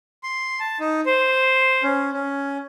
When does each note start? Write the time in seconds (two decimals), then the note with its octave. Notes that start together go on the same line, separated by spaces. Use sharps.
0.23 C6
0.60 A5
0.80 D#4
1.06 C5
1.83 C#4
2.13 C#4